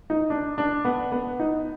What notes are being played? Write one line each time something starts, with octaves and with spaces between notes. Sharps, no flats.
D#4
D4
D4
B3
B3
D#4